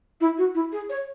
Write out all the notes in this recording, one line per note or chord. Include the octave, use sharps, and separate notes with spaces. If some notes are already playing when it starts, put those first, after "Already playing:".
E4
F#4
E4
G#4
C#5